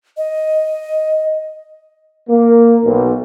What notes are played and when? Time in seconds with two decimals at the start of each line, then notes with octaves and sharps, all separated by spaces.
0.17 D#5
2.29 A#3
2.84 B1